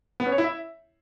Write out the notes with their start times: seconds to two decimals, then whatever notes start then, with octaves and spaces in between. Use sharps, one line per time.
0.20 B3
0.26 C#4
0.32 C#5
0.38 E4
0.44 E5